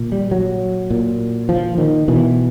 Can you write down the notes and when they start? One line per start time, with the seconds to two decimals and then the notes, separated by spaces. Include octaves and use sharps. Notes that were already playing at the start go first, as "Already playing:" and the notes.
Already playing: A#2
0.12 G3
0.31 F#3
0.90 A#2
1.49 F3
1.78 D#3
2.08 B2 E3